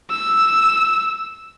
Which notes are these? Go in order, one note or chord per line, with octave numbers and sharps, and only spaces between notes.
E6